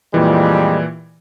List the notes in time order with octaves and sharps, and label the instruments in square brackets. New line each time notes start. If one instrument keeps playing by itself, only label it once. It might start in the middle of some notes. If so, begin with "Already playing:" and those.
[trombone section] F2 G3 G#3 [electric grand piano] A#2 E3